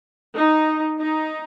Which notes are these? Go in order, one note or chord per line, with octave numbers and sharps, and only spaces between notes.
D#4
D#4